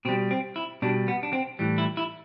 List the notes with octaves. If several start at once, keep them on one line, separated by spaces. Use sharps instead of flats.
B2 G3 C4
C4
E4
B2 G3 D4
B3
D4
C4
A2 E3 G3
E4
E4